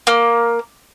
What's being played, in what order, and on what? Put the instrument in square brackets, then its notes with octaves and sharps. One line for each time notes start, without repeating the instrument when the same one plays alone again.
[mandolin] A#3